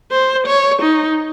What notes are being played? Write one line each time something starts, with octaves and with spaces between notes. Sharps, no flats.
C5
C#5
D#4